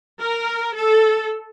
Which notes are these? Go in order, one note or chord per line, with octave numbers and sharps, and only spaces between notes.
A#4
A4